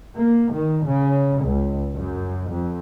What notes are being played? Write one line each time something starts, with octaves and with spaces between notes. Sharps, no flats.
A#3
D#3
C#3
C#2
F#2
F2